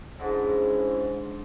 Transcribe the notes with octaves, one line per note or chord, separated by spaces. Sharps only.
G#2 D3 G#3 C#4 E4 C5